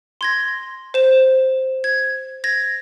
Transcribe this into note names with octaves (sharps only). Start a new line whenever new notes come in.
C6 G#6 A#6
C5 E7
G#6
G#6 A#6